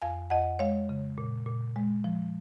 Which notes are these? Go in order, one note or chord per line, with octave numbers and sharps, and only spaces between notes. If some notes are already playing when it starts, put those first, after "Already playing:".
F2 F5 G#5
F2 D#5 F#5
G#3 C#5 F5
C#3
A#2
A#2
G#3
F3